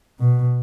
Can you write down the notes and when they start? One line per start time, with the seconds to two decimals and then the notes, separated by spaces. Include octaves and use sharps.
0.20 B2